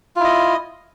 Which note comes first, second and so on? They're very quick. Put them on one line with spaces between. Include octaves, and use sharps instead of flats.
F4 E4 D#5